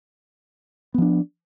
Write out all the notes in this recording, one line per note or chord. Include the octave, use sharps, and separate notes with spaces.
F3 B3 D4